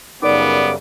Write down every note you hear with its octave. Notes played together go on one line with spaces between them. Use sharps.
F#2 C#3 G3 B3 D#4 A#4 D5 D6